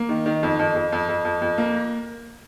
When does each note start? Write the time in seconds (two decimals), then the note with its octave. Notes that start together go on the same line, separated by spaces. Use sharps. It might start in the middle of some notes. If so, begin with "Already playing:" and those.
Already playing: A#3
0.09 D#3
0.26 D#3
0.43 F2
0.59 F2
0.75 F2
0.92 F2
1.09 F2
1.25 F2
1.42 F2
1.58 A#3